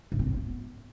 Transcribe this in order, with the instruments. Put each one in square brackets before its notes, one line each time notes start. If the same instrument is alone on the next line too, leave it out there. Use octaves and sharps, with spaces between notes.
[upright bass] G#2
C4
A2
B3